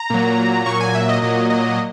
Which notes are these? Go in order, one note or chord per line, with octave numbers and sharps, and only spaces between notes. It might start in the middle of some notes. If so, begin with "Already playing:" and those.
Already playing: A#5
A#2 F#3
A#2 F#3 C#6
G#5
E5
D#5
A#2 F#3 D#5
D#5